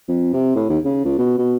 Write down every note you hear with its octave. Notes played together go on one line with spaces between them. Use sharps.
F2
C3
A2
D#2
C#3
C#2
B2
B2